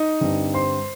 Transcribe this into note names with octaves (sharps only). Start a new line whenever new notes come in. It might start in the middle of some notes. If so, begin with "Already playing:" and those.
Already playing: D#4 D#5
G2 D3 G3 C4
C5 C6